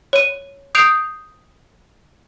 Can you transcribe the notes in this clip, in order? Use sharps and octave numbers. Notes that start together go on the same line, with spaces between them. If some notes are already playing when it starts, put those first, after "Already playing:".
C#5 D#7
D#6 G6 C7 D7 F7